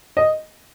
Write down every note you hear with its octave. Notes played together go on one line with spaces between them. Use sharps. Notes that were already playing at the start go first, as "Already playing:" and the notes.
D#5